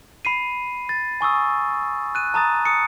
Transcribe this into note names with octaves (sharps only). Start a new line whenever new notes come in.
B5 C7 D#7
A6
G#5 C#6 D#6 E6
F#6 D#7
A5 A#5 D#6 A6
D#6 C#7